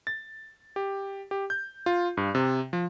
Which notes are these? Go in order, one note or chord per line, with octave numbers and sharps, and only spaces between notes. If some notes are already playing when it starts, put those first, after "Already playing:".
A6
G4
G4
G6
F4
G2
C3
F3